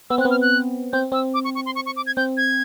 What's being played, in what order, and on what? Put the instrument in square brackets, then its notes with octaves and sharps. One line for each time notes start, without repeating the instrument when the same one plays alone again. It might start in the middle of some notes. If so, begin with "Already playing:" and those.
[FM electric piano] B3 [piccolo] E6
[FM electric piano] C4 [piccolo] F#6
[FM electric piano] B3
[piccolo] F6
F#6
[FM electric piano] C4 [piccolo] G6
[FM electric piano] C4 [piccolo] E6
[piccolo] D6
C#6
C#6
C6
C#6
C#6
D6
G#6
[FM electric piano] C4 [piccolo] G6
[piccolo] G#6